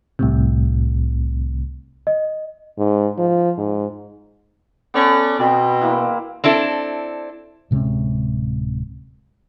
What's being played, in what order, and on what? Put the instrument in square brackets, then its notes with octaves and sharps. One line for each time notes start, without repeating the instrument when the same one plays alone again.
[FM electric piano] C2 A2 C3
[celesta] D#5
[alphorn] G#2
F3
G#2
[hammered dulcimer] B3 [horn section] C#4 A4 D5
[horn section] B2 [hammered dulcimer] C4
[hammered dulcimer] E3 A#3 E4
[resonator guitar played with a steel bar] C4 D4 E4 A4
[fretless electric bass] D1 C3 G#3 C#4